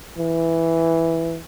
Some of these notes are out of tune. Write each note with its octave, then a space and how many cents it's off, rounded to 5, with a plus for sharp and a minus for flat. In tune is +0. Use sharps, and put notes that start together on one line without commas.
E3 +0